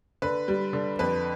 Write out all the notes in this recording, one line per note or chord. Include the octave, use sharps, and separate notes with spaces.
D3 B4
G3
D3
F2 B4